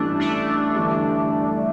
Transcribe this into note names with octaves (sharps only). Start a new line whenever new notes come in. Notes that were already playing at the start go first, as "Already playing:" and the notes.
Already playing: A1 G2 E3 A3 D4
A3 D4
G1 G2 E3 G3